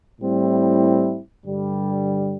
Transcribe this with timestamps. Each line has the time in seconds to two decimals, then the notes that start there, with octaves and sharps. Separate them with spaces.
0.21 A2 G3 C4 E4
1.44 G2 D3 G3